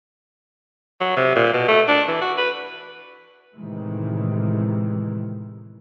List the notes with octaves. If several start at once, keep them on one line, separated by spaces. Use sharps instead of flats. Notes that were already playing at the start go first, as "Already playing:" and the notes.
F#3
C3
A#2
B2
A3
D4
E3
F#4
B4
A2 C3 D#3 E3 G#3